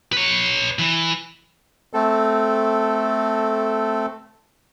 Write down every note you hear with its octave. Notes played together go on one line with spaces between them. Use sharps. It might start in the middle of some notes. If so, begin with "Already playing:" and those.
B4 C#5
E3
A3 C4 A4